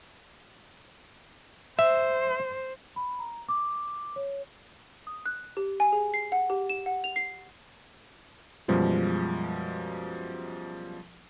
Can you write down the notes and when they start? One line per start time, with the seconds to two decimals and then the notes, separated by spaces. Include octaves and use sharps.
1.79 C5 E5
2.96 B5
3.19 A#5
3.49 D6
4.16 C#5
5.07 D#6
5.26 F#6
5.57 G4
5.80 G#5
5.93 G#4
6.14 C7
6.32 F#5
6.50 G4
6.69 E7
6.86 F#5
7.04 F7
7.16 C7
8.68 F#2 B2 F3 G3 G#3